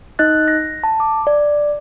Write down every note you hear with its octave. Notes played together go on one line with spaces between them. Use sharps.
D#4 D#5 F#6 A6
A#6
A5
D6
D5